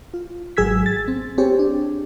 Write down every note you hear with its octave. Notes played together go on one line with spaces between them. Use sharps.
F4
G#1 F#3 G#4 E6 G#6 B6
A6
C4
C4 G4 G#4 C#5
D4